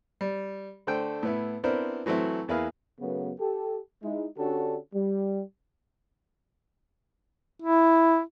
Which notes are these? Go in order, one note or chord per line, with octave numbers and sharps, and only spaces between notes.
G3
D3 A3 D4 C5 G5
A2 B3 E4
B3 C4 D4 E4 A#4 C5
E3 F#3 A3 C4 E4
E2 A#3 E4 G#4 B4 F5
F#2 C#3 F#3 A3 B3
G4 A4
G#3 D#4 E4
D3 C#4 D4 F#4 G4 A4
G3
E4